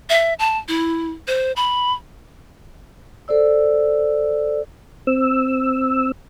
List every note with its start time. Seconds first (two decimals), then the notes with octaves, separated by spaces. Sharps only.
0.10 E5
0.39 A5
0.68 E4
1.28 C5
1.56 B5
3.28 A4 C5 D5 E6
5.07 C4 E6